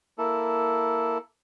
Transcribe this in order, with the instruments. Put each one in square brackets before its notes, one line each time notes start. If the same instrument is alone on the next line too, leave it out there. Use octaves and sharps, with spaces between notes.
[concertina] A#3 E4 A4